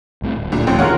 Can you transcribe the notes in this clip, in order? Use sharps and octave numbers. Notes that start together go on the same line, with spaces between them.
C2 A2 C3
D1
C2 A#2 D3
A1 F3 C4 C#4
E2 B2 D#3 F4 G#4 A#4 C#5 F#5